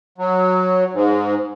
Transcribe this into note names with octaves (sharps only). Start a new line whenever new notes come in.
F#3
G#2